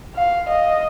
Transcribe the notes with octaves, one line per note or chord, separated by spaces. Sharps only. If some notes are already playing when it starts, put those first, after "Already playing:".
F5
D#5